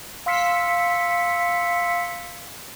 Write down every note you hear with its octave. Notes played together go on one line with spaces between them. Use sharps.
F5 C6 E6 B6 C#7